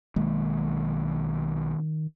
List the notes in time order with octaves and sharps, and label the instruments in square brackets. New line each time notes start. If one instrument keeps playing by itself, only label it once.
[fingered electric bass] B1 G#3 A#3 [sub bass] D#3